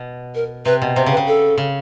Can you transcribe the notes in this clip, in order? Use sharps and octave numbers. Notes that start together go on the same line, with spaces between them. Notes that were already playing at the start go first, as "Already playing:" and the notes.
Already playing: B2
A#4
C3 B4
B2
C3 C5
C#3
B4
C#3
A4
C#3